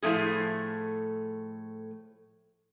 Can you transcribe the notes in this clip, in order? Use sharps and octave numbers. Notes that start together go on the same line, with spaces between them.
A2 F3 A3 C#4 G#4